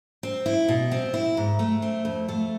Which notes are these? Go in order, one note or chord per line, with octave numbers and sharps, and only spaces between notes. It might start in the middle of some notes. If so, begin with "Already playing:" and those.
C4
E4
B2
C4
E4
G#2
A3
C4
F2
A3